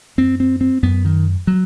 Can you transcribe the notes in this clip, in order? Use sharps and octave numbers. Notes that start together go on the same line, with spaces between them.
F#2 C4
C4
C4
F#2 B3
D#3
F#3